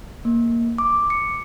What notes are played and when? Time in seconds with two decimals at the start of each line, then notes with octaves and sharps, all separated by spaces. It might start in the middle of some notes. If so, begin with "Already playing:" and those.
0.25 A#3
0.78 D6
1.10 C#7